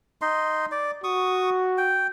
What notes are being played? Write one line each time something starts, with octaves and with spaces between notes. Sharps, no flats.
D#4 D#5 C6
D5
F#4 C#6 D#6
G5